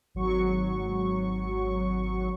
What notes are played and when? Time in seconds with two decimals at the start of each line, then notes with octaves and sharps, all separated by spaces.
0.15 G#1 F#3 C#6